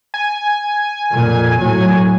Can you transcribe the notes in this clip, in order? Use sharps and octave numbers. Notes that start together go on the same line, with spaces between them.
G#5
F2 A#2
A2 F#3